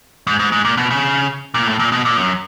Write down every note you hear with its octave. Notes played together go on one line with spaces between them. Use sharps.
G#2
G#2
G#2
A#2
B2
C#3
A#2
A2
A#2
B2
A#2
F#2